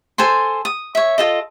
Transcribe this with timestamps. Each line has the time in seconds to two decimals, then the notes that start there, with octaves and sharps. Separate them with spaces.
0.18 A4 C5 G#5 C6
0.65 D#6
0.95 C#5 E5
1.18 F4 A4 D#5